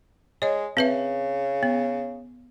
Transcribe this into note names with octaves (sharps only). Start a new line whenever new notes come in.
G#3 C#5 D#5
C#3 C4 B4 E5
B3